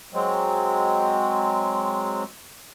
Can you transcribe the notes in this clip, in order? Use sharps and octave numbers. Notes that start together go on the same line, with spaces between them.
F#3 G#3 C4